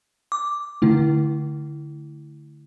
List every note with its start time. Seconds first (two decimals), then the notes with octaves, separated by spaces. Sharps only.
0.32 D6
0.82 D3 A3 E4